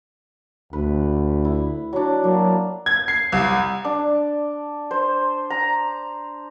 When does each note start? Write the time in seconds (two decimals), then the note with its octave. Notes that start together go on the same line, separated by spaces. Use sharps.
0.73 D2 B4
1.45 E4
1.93 F#3 D4
2.24 F#3 A#3
2.86 G#6
3.08 C7
3.32 C2
3.84 D4
4.91 C5
5.50 A#5